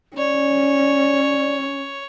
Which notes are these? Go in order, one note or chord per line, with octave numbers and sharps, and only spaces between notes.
C#4 C#5 D5